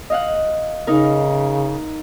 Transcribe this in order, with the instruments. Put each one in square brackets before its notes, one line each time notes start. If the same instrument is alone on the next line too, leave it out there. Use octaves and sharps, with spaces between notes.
[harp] D#5 F5 F#5
[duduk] C#3 [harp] D#4 A#4